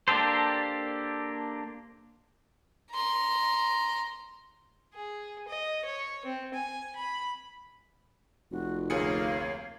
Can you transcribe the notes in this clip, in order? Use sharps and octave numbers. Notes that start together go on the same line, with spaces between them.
A#3 D4 G4 A4 C5
A#5 C6
G#4
D#5
C#5
C4
G#5
B5
F1 F#4
D2 A#3 G#4 C#5 F5 C#7